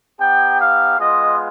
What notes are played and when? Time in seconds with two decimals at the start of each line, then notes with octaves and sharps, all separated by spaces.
0.19 B3 D#4 G4 G5
0.59 F5
0.99 G#3 B3 F4 D#5